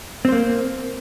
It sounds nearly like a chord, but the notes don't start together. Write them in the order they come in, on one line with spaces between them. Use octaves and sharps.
C4 C5 A#3